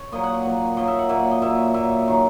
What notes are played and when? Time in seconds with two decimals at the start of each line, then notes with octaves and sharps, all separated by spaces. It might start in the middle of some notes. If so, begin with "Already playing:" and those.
Already playing: C#5
0.12 A#2 F#3 D#5
0.24 F#5
0.34 F#5
0.46 A#2 F#3
0.77 A#2 F#3 D#5
0.87 E5
0.99 F#5
1.09 A#2 F#3 E5
1.31 D#5
1.42 A#2 F#3 E5
1.74 A#2 F#3 E5
2.08 D#3 F#3